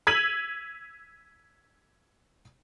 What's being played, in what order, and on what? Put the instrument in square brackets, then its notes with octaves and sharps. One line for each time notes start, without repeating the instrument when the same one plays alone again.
[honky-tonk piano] E6 G#6 B6 D#7 F7 F#7